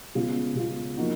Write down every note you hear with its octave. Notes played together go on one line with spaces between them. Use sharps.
C#3 G#3 B3 F4
C#3 G#3 B3 F4
F3 A#3 D#4 F#4